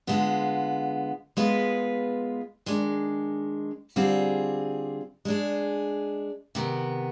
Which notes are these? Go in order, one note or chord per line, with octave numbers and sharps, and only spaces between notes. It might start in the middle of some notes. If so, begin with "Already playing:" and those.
D3 G#3 B3 F4
G#3 B3 F4 B4
D#3 G#3 D4
D3 G3 C4 F4 G#4
G#3 D4 G#4
C3 D#3 B3